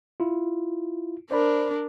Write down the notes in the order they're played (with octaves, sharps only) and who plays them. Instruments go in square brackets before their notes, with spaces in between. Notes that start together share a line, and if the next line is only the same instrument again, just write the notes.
[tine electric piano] E4 F4
[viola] D4 A#4 [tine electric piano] C5 D5 B5